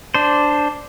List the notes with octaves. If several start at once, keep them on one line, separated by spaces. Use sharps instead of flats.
D4 C5